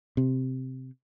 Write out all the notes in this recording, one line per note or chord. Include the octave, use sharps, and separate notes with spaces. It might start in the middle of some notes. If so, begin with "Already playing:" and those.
C3